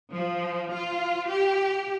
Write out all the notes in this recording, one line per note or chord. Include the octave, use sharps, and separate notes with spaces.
F3
F4
G4